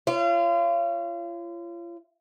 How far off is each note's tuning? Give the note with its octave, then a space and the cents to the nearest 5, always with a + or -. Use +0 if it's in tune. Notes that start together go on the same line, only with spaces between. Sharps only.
F4 -35 C#5 +0